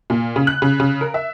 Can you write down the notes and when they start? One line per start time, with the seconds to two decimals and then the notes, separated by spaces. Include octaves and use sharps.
0.10 A#2
0.36 C#3
0.47 F#6
0.62 C#3
0.80 C#3
1.01 A#4
1.14 E5